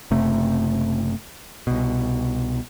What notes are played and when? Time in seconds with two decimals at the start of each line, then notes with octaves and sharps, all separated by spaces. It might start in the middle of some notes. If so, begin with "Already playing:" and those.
0.11 F#1 C3 A3
1.67 C2 B2